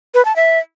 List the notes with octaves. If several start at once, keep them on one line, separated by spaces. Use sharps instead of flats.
B4
A5
E5